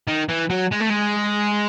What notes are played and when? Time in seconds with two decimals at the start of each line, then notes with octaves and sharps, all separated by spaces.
0.07 D#3
0.29 E3
0.50 F#3
0.71 G#3
0.80 A3
0.89 G#3